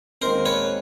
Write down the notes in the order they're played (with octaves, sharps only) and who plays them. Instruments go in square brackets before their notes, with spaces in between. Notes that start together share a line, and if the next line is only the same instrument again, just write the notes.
[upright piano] D#2 D#3 G#3 C4 [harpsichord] A#4 C5
[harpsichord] B4 C#5